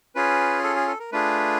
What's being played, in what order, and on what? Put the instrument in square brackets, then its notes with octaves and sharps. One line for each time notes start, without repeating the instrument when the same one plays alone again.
[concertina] C#4 F4 G#4 B4
A4
G#4
A4
A#4
A3 D4 F4 G#4 B4